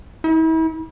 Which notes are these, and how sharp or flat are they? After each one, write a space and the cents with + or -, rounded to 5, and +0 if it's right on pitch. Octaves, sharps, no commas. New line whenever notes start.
E4 -40